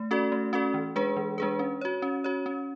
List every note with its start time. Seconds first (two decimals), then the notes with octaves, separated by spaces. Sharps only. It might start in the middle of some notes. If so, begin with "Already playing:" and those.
Already playing: A3
0.11 C#4 F#4 A4 D5
0.32 A3
0.53 C#4 F#4 A4 D5
0.74 E3
0.96 G#3 D4 G#4 B4
1.17 E3
1.38 G#3 D4 G#4 B4
1.59 C#4
1.81 F#4 C#5
2.02 C#4
2.24 F#4 C#5
2.46 C#4